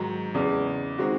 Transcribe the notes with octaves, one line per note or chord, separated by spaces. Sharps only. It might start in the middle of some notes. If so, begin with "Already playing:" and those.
Already playing: G#2 D#3 F#3
E2 C#3 G#3
D#3 G#3 C4 F#4